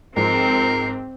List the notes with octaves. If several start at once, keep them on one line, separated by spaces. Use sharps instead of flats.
G#2 F3 C4 A#4 C7